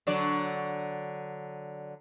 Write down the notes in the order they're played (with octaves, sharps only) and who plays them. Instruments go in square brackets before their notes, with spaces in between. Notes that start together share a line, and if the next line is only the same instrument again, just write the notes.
[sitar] D3 F#3 D5